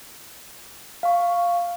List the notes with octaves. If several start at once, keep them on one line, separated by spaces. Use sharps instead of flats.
F5 C#6